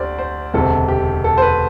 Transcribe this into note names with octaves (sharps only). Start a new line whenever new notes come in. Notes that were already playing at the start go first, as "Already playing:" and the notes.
Already playing: D2 D3 G4 C5 D5
C5
E1 D2 C3 A4
G4
A4
C5
B4